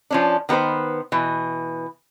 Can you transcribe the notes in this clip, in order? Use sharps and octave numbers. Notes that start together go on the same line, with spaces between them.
F3 C#4 D4
D#3 B3 F#4 B4 C5
B2 E3